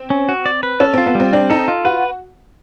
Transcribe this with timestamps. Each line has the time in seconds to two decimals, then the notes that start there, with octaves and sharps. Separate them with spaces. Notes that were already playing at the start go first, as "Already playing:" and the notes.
Already playing: C4
0.10 C#4
0.29 F#4
0.46 D5
0.63 B4
0.80 C#4 A4
0.94 C4 F4
1.06 B3
1.15 G3 C4
1.33 C4 D4
1.50 D#4 A4
1.68 F4
1.85 F#4 B4